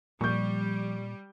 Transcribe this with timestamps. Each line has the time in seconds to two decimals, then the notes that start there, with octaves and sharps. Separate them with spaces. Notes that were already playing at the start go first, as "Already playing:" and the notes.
0.21 A#2 F3 G3 C#6 G6